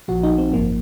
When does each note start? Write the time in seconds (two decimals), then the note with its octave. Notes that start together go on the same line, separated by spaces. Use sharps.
0.08 A#1 A#2 F3 F#4
0.23 D#4
0.38 C4
0.53 G#1 F#2 F3 A#3